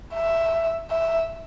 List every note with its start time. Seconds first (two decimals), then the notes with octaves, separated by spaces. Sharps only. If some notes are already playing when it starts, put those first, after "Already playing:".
0.13 E5
0.91 E5